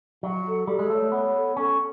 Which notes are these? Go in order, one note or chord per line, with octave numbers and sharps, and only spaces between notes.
F#3 F#5
A4
G3 A4
G#3
A3 C#5
B3 C#5
A4
C#4 A4